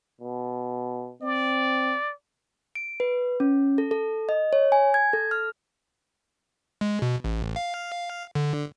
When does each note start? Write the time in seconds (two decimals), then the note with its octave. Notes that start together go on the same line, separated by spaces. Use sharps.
0.21 B2
1.22 C4 D5
2.75 D7
3.00 B4
3.40 C#4
3.78 A4
3.91 A4
4.29 D#5
4.53 C#5
4.72 G#5
4.94 G#6
5.13 A4
5.31 F6
6.81 G#3
7.02 B2
7.24 A1
7.56 F5
8.35 D3